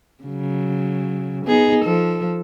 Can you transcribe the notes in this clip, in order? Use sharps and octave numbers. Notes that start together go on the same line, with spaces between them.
C#3 F#3
B3 D#4 G#4
F3 A4